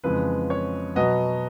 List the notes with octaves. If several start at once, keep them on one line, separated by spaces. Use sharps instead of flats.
F2 C#3 E3 G#3 B4
C#5
B2 F#3 B3 D#5